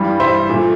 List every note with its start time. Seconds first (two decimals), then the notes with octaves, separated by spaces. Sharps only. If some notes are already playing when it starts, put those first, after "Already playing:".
Already playing: G2 E3 G3
0.20 C5 E5
0.49 A#2 A3